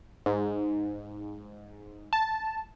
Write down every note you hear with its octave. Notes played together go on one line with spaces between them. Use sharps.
G#2
A5